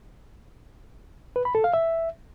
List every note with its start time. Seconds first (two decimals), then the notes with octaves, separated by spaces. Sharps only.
1.36 B4
1.45 B5
1.55 A4
1.64 F5
1.74 E5